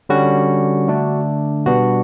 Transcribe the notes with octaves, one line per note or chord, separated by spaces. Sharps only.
D3 G3 C#4 F#4
D3 A3 D4
B2 G3 B3 D4 F#4